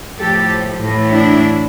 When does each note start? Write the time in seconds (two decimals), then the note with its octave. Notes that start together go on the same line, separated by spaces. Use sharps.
0.19 A2 F3 G4 A4
0.81 A2 E3
1.11 D4 E4